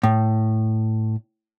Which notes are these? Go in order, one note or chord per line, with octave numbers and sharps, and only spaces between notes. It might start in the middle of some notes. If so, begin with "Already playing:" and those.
A2